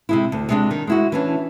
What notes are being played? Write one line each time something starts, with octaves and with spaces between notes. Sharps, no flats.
C3 G#3 E4
D2
C3 G#3 D4
D#3
G#3 E4 F#4
E3 C#4 D4